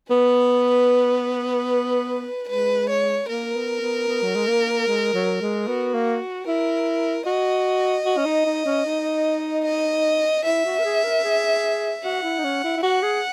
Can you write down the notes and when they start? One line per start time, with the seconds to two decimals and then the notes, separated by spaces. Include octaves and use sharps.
0.10 B3 B4
2.49 G#3 B4
2.90 C#5
3.28 A#3 A#4
3.55 B3
3.81 B3
4.08 B3
4.23 F#3
4.35 G#3
4.48 A#3
4.88 G#3
5.14 F#3
5.41 G#3
5.67 B3 F#4
5.94 A#3
6.47 E4 A#4
7.26 F#4 D#5
8.05 F#4
8.17 C#4
8.25 D#4
8.46 D#4
8.66 C#4
8.86 D#4
9.65 D#5
10.45 E4 E5
10.65 F#4
10.79 A#4
10.85 G#4
11.04 A#4
11.24 G#4
12.04 F#4 F#5
12.23 E4
12.39 D#4
12.44 C#4
12.64 E4
12.77 E4
12.83 F#4 F#5
13.03 G#4